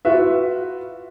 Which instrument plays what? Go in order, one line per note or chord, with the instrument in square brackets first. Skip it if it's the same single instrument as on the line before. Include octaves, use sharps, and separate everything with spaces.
[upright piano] F4 F#4 B4 E5